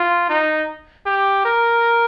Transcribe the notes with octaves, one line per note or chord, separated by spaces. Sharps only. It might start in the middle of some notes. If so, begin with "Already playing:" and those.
Already playing: F4
D#4
G4
A#4